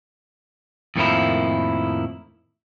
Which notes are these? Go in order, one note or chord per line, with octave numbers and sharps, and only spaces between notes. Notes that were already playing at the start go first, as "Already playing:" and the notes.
F2 A2 D#3 F3 A#3 E4